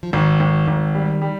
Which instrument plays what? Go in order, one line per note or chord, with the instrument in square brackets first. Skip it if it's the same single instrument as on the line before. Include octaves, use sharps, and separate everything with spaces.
[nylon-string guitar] F3
[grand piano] G#1 [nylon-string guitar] D#3
[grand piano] G#1
G#1
G3
G3